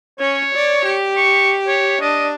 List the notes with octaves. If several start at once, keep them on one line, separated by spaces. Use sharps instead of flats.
C#4 C#5
D5
G4
C#6
C#5
D4 D#5